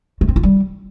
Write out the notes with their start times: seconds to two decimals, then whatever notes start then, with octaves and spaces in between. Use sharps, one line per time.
0.21 A3
0.29 C4
0.36 F4
0.43 G3